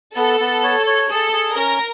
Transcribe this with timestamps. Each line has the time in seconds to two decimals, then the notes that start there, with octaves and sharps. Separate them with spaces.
0.16 B3 A4
0.40 B3
0.63 C#5
0.87 C#5
1.10 G#4 A4
1.33 G#4
1.56 C#4 A#4